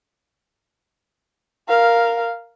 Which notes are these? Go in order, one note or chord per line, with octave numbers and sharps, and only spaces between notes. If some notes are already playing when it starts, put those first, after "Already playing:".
A#4 F5